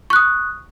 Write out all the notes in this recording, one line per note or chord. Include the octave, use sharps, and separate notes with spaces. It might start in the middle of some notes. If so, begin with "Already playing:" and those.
C#6 D#6 F#6